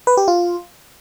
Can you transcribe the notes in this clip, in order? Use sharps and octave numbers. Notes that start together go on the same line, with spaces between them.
B4
G4
F4